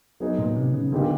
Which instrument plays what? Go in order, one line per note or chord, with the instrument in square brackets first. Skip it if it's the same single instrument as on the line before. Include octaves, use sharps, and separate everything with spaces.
[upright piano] F#3 B3 D#4 G#4
[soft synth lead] A#2
C3
C#3
[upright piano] A#2 G3 B3 D#4 G4 [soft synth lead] D3